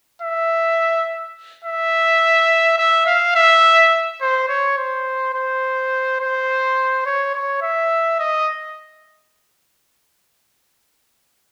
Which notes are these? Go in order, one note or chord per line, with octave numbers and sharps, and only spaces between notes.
E5
E5
E5
F5
E5
C5
C#5
C5
C5
C5
C#5
C#5
E5
D#5